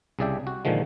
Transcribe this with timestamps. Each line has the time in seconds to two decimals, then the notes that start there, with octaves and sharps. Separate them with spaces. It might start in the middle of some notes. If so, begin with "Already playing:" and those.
0.19 C2 C#3 G#4 D5 E5 G5
0.47 F#4
0.65 A#2 D3 D#3 F3 G#3